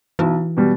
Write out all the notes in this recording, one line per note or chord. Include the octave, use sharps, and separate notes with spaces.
B1 E3
B2 G3